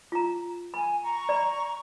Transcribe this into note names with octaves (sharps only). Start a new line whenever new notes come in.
F4 A#5
G#5 B5
A#5 C#6
D5 B5